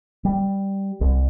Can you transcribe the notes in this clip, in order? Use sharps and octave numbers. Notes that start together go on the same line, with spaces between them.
G3
C2